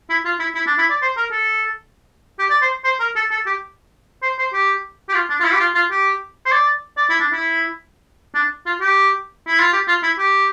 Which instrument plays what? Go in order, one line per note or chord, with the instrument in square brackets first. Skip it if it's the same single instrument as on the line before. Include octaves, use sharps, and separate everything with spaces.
[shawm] E4
F4
E4
E4
D4
E4
D5
C5
A#4
A4
G4
D5
C5
C5
A#4
A4
A4
G4
C5
C5
G4
G4
F4
D4
F4
E4
G4
F4
F4
G4
C5
D5
D5
E4
D4
E4
D4
F4
G4
E4
F4
G4
F4
E4
G4